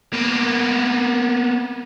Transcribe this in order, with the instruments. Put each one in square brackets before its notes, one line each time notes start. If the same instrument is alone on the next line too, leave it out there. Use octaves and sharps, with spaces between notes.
[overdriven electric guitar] A#3 B3